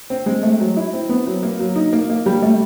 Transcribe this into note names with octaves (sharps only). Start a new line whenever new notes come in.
C4
G#3
A3
F#3
E4
C4
B3
F#3
A#3
F#3
D#4
A#3
A#3
G3
A3